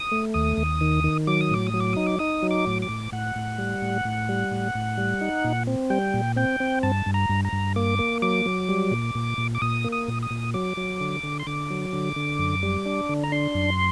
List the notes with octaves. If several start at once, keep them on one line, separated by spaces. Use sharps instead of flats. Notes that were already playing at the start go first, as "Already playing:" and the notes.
Already playing: D#6
A3
D#2 D#6
D#2
D#3
D#3
F#3 D6
D#6
A2 D6
D#6
F#3
D6
D#4 D#6
D6
D#4 D#6
F#3
D6
A2
D6
A2
A2 F#5
A2
G3
A2
A2
G3
A2
A2
G3
D#4
A#2
C4
G3 G5
A#2
C4 G5
C4
G2 A5
G2
A#5
G2
A#5
G2
A#3 D6
A#3
F#3 D6
F#3
G3
A#2
A#2
A#2
D6
A#2 D#6
A#3
D#6
A#2
D#6
A#2
F#3 D6
F#3
D3
D3
C6
D3 D6
F#3
D3
D3
F#2
G3
D4
D3
A#5
D4 C6
F#2